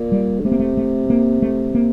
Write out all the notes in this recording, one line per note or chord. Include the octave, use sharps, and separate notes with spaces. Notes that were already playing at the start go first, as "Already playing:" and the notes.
Already playing: A#2
G3
D3
C3 A3
A#3
A3
A3
A#3
A3
A#3